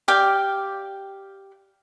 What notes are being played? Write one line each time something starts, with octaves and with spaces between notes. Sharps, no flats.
G4 D5 F5 G5